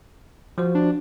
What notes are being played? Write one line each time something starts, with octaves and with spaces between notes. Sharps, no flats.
F3 F#4 C5
D4